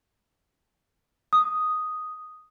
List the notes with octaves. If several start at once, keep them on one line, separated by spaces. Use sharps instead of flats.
D#6